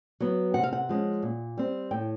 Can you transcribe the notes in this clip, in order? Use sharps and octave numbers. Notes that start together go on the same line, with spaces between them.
F#3 B3
C3 F#5
F5
F#5
F3 G#3 C#4
A#2
G3 C4
A2 G5